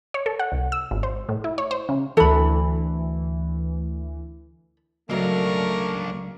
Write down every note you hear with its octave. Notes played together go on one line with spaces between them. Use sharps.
C#5
A4
F#5
C2
E6
G#1
C5
A2
E4
C#5
C5
C#3
D2 E3 A4 B5
C#2 F#3 A3 A#3 D4 A#4 C#6